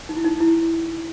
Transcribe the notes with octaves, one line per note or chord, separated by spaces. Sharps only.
D#4
E4
D#4
E4